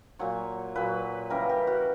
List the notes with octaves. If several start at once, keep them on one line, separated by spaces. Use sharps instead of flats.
A#2 F#3 C#5
A#2 F#3 B4
C#3 E3 G3 A#4
G4
F#4